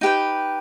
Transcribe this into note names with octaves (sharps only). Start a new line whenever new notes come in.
D#4 G4 B4 G5